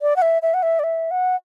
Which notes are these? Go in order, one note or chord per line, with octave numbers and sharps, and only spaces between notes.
D5
F#5
E5
E5
F#5
E5
D5
E5
F#5